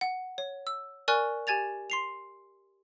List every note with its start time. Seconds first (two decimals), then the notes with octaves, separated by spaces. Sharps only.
0.01 F#5
0.38 C#5
0.67 E6
1.08 A#4 D5 G#5 C#6 F6 F#6
1.47 G4 G#5 G#6 A6 F7
1.90 C6 C7 F7